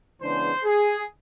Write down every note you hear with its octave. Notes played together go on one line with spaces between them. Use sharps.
C#3 E3 G#3 B3 D4 C5
G#4